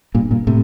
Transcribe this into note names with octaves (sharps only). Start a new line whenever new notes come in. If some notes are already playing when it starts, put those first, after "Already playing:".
G2 A#2
G2 A#2
A2 C3